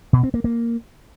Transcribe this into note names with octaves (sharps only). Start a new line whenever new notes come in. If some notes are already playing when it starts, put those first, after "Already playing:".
B2
C4
A#3
A#3